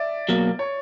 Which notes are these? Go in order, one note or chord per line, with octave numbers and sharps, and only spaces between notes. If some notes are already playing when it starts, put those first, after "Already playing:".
Already playing: D5 E5
B2 F#3 A#3
C#5